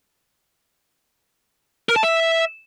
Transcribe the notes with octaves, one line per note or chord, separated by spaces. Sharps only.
A#4
A5
E5